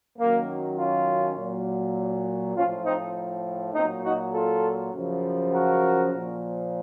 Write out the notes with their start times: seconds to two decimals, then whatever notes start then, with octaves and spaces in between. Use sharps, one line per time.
0.18 F#2 D#3 F#3 A#3
0.78 C#4 F4
1.37 A#2 F#3
2.56 A2 F3 C#4 F4
2.85 C4 D#4
3.75 A#2 F#3 C4 D#4
4.04 D#4 F#4
4.34 F4 A4
4.93 F#2 C#3 F3
5.53 F#4 A#4
6.12 A#2 F3